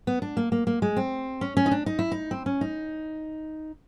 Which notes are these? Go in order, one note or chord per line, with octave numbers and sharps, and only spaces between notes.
B3
D4
A#3
A#3
A#3
G#3
C4
C#4
C#4
D#4
D4
D#4
E4
D#4
C4
C#4
D#4